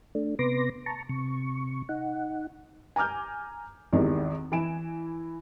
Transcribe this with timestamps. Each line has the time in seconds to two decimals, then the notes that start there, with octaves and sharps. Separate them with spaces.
0.15 A3 D4
0.39 C3 B3 B4 C6 D6 A#6
0.86 A5 A#5 C#6
1.09 C3 C#6
1.89 D#4 F#5
2.96 G#5 A#5 D6 F6 G6
3.93 G#1 E2 D#3 G4
4.52 E3 E4 G#5 D7 E7